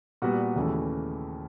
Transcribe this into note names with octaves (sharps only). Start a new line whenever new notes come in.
A#2 G3 B3 F#4
D#2 C#3 E3 A3